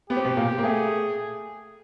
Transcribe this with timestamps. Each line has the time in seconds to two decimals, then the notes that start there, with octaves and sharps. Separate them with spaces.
0.10 B3 G4
0.17 C4
0.24 B2 B3
0.37 A#2 A#3
0.58 A#3
0.64 A3 G#4